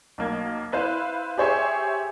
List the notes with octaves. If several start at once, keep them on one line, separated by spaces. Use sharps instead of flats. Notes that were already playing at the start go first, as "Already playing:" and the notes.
B1 A#3 G#6
E4 B4 C5 F5
G4 G#4 C5 C#5 E5 G#5